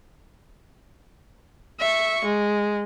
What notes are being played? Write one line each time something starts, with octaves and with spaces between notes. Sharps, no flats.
E5 C#6
G#3